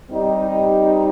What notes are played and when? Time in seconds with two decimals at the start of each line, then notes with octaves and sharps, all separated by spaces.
0.10 G3 C4 D#4 G4